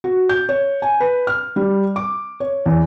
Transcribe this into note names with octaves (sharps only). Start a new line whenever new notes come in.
F#4
G6
C#5
G#5
B4
F6
G3
D6
C#5
E2